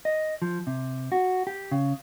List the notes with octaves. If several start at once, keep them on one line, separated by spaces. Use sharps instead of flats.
D#5
F3
C3
F#4
G4
C#3